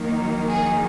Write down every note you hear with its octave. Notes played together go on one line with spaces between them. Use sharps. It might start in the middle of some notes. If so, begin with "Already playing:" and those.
Already playing: D#3 F#3 A#3
G#4